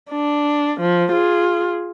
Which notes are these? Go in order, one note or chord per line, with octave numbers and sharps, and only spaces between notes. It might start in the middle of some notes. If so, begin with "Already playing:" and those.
D4
F3
F4 G#4